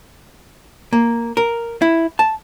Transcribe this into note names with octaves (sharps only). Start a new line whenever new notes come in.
A#3
A#4
E4
A5